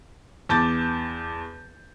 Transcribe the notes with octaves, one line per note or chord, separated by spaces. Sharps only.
E2 A5 D6 G6 A6